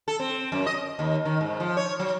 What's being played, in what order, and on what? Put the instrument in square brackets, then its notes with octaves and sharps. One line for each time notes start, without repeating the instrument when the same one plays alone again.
[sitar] A4
C4
F#2
D#5
D#2
D#3
G#2
F3
C#5
F#3